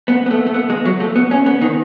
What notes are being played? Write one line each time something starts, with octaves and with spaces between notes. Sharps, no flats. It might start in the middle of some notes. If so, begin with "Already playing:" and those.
B3
B3
A3
A3
B3
G#3
F#3
A3
B3
C#4
B3
D#3